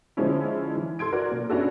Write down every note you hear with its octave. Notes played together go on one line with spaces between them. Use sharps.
D3 F3 G#3 C#4 E4
E3
A4 C6 G#6 D7
F#4 A#4 D5
A#2
B3 C#4 D4 F#4 A4